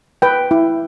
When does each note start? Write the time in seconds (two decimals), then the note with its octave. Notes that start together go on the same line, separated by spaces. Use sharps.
0.22 B4 G5
0.51 E4